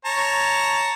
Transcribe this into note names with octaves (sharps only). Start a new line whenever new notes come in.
C#5 A5 A#5